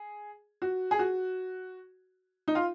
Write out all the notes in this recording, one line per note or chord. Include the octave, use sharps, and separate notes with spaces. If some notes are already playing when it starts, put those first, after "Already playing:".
Already playing: G#4
F#4
G#4
F#4
D#4
F4